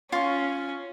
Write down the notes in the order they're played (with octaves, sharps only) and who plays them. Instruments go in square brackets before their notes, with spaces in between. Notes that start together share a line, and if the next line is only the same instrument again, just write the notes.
[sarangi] C#4 [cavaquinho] F4 C#6